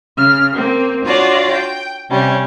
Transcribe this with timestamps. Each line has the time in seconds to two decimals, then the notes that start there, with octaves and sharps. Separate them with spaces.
0.18 C#3 F6
0.55 A#3 C4
1.05 D4 F4 F#4 C#5 D5
1.51 G5
2.10 C3 G3 C#4